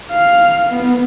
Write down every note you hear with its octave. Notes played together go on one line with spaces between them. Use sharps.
F5
B3